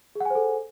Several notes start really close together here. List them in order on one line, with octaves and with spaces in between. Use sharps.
G#4 F#5 G#5 C5 A4